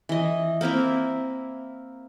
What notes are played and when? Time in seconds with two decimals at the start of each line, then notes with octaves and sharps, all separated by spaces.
0.09 E3 D#5
0.61 A#3 C4 E4 A#4